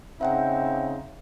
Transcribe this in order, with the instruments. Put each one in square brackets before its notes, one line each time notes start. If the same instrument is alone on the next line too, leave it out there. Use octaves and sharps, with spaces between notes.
[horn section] C#3 C4 D#4 [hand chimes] E5 F#5 G5